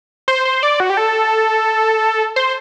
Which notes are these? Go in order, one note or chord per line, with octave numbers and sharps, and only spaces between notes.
C5
C5
D5
F#4
G4
A4
C5